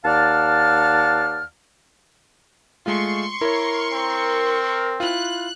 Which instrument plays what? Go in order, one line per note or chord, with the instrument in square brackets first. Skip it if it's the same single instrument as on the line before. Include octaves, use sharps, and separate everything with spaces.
[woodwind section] D#2 D5 F5 F#5 A5 F6
[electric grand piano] G#3 A3 F4 [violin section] C6 C#6
[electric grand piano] E4 C#5 [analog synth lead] A#4
[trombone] C4
[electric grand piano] E4 F4 [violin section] F#6